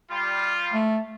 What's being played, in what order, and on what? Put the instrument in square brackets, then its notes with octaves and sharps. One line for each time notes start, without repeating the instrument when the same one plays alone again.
[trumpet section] G3 F4
[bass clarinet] A3